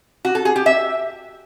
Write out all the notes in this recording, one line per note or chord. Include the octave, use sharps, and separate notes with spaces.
F#4
A4
G#4
G4
E5